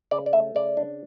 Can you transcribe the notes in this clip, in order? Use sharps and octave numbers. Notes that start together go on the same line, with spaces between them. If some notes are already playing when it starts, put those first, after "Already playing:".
C#3 D5
D5
A3 E5
C#3 D5
D4